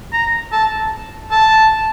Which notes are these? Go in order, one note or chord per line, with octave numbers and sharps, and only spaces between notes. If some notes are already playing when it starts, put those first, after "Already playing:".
A#5
A5
A5